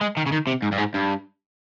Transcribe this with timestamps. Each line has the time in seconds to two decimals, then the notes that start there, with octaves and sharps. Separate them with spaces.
0.01 G#3
0.17 D#3
0.26 C#3
0.32 D#3
0.47 C3
0.62 G#2
0.72 G2
0.78 G#2
0.94 G2